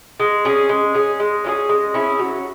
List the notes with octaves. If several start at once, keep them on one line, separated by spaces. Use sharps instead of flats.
G#3
C#4 G#4
G#3
C#4 G#4
G#3
C#4 E4 G#4
G#3
C#4 E4 G#4
F#3